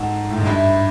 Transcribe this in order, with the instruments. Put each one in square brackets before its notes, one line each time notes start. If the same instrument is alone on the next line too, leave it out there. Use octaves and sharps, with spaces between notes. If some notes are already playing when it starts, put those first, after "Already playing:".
Already playing: [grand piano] G#2 [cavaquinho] F#4 A4
[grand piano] A2
G#2
[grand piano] G2 [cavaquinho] E4 G4 B4 E5